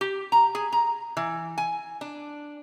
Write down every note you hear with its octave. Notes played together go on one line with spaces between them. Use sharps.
G4
A#5
G#4
A#5
E3
G#5
D4